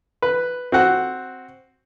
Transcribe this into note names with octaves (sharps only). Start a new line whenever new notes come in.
B4
C4 F#4 F#5